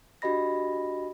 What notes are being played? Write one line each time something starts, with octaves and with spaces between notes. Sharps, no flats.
D4 F#4 G4 D#5 B5 A#6